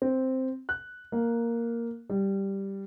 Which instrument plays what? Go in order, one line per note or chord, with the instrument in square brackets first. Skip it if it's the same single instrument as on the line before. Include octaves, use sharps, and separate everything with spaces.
[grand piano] C4
F#6
A#3
G3